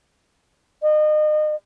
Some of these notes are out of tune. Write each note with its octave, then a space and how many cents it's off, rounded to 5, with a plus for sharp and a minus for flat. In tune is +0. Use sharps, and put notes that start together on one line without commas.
D#5 -35